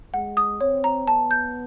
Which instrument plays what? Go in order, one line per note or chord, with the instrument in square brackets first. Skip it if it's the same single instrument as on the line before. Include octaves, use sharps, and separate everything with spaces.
[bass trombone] G#3 [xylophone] F#5
[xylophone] D#6
[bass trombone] C4 [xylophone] C#5
[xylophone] A#5
[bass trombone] B3 [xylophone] A5
[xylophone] G6